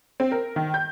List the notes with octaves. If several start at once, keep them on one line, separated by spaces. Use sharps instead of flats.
C4
A#4
D#3
G6